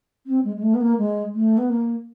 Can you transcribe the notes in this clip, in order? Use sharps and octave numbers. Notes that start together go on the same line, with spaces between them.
C4
G#3
G#3
A3
B3
A#3
G#3
A3
B3
A#3